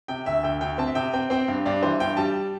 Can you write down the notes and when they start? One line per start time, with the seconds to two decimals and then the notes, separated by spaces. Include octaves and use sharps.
0.08 C3 G5
0.26 D2 E5
0.43 D2 G5
0.61 D2 G5
0.78 C4 A5
0.87 E5
0.95 C3 G5
1.13 C4 G5
1.30 C4 G5
1.48 G2
1.65 G2 D5
1.83 E3 C5
2.00 G2 G5
2.17 G3 A5